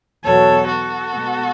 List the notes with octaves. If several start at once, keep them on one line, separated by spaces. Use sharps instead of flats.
E2 B2 F#3 A4 C#5
F#4 A4
B2 G#3 B3